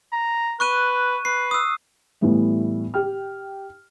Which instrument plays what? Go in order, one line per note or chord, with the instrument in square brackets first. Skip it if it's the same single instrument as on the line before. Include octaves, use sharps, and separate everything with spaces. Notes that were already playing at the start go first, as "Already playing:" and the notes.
[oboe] A#5
[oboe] B4 [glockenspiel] C#6 F#6 D#7
[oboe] B4 [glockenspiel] C7
[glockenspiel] D#6 E6
[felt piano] A2 E3 G3 A3 B3
G4 G5 F6